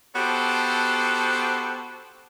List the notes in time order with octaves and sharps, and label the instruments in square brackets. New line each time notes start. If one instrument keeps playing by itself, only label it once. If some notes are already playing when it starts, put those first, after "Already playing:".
[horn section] B3 D4 F#4 G4 A4 C5